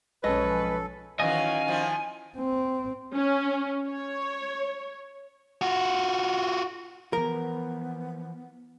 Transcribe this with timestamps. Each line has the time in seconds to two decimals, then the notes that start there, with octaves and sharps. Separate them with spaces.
0.24 B1 F3 G#3 C#4 A4 B4 D#5
1.20 D#3 E3 F#3 C#4 D#5 F5 G#5
1.66 D#3 F3 E4
2.38 C4
3.13 C#4
3.88 C#5
5.61 F4 F#4
7.13 E3 F3 B3 A#4